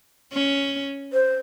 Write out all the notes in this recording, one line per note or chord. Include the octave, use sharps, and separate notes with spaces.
C#4
C5